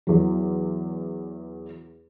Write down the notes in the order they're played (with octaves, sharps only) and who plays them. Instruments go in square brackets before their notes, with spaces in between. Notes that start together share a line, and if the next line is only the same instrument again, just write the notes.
[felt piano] E2 F#3